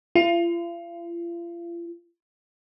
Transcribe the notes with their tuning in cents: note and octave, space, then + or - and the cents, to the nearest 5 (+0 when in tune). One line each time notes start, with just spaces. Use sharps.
F4 -40